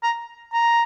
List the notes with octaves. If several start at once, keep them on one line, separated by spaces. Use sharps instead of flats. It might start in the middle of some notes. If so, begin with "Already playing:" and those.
A#5
A#5